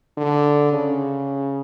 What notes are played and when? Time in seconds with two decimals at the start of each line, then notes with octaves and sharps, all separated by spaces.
0.18 D3
0.73 C#3